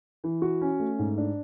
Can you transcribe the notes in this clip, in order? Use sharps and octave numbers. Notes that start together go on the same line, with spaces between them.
E3
F#4
C#4
A3
G#2
D4